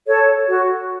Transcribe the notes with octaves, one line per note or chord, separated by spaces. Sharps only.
A4 C#5
F#4